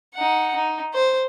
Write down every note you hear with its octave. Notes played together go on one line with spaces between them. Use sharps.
D#4 F#5
D#4
C5